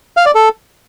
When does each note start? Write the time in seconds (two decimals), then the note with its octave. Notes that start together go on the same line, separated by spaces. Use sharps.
0.17 F5
0.26 D5
0.35 A4